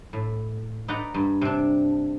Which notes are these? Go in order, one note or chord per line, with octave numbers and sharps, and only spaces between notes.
A2
D#4 B4 D5 F#5 A#5
G2
C3 D4